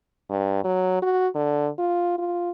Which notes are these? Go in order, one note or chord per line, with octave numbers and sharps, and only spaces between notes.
G2
F#3
F#4
D3
F4
F4